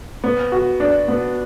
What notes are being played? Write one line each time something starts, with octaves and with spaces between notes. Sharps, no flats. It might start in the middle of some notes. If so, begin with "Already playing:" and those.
B3
F#4
D4
B3